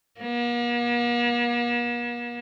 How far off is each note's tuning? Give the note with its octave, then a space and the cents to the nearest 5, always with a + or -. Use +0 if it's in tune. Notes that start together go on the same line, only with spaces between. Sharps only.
A#3 +45